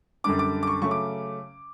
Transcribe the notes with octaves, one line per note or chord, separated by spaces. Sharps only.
F#2 D3 G3 D4 D6
D6
D6
C#6
C#3 F#3 A3 C#4 C#6
D6